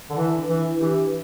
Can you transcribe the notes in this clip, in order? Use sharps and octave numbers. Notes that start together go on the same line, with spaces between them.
D3
E3 E4
D4
E3
E4
E3 D4 G4